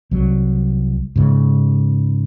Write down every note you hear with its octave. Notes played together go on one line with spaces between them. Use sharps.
C2 F#3
G#2 C#3